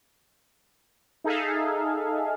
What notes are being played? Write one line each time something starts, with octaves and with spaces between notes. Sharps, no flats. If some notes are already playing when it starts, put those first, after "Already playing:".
D#4 G#4 A4 E5 F5